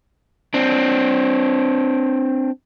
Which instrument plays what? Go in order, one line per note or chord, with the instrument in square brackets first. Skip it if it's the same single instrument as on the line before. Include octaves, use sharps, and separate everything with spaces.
[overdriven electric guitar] C4 D4